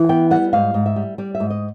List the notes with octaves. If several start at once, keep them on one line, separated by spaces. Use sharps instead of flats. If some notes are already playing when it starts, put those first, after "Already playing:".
Already playing: E3
B3 G5
G3 F#5
G#2 F5
G#2
E5
G3
G3 D5
E5
G#2
D#5